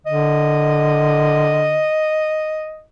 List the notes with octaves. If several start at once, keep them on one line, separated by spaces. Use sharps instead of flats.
D3 D#5